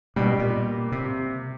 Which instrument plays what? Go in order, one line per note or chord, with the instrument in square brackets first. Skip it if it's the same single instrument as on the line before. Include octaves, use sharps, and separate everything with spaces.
[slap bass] B2 [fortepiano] G3
[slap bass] A#2
C3